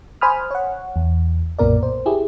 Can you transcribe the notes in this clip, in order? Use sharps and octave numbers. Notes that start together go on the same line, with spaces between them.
C5 G#5 B5 D#6 F6
C#5 F#5
E2
B1 F#2 A#2 B3 A#4 D5
C5
E4 G4 G#4